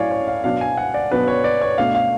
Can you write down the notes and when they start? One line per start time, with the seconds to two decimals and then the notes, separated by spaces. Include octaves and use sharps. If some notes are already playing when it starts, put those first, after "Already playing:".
Already playing: A2 F#3 C#4 C#5 D5 F5 G#5
0.11 C#5
0.28 F5
0.44 B2 F#3 B3 D4 F5
0.61 G#5
0.78 F#5
0.94 D5
1.11 B2 F#3 B3 D4 B4
1.28 C#5
1.44 D5
1.61 C#5
1.78 B2 A3 D4 F5
1.95 F5